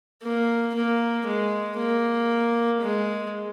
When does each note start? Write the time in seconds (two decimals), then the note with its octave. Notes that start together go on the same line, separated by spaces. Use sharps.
0.23 A#3
0.74 A#3
1.26 G#3
1.78 A#3
2.81 G#3